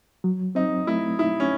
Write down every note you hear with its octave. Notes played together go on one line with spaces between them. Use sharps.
F#3
C4 D#4
A3 E4
D#4 E4
C#4